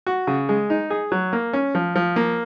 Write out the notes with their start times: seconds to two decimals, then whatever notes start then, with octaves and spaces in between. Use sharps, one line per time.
0.07 F#4
0.27 C#3
0.49 G#3
0.70 D#4
0.90 G#4
1.12 F#3
1.33 A#3
1.53 C#4
1.75 F3
1.95 F3
2.16 A#3